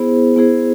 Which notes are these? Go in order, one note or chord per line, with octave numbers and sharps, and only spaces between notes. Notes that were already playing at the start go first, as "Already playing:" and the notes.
Already playing: B3 E4 G#4 C5
B3 E4 G#4 C5